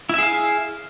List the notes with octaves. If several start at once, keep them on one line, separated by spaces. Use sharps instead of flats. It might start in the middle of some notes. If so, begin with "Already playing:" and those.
E4 G#4 E5 F5